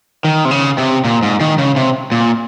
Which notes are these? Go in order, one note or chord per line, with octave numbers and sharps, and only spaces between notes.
D#3
C3
C#3
C3
A#2
G#2
D#3
C#3
C3
A#2